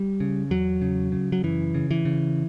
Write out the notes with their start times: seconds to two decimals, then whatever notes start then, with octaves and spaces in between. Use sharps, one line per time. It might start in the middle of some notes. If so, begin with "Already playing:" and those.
Already playing: G3
0.20 C#3
0.50 E2 F#3
0.82 C#3
1.12 C#3
1.32 F#3
1.43 F#2 E3
1.74 C#3
1.91 E3
2.05 C#3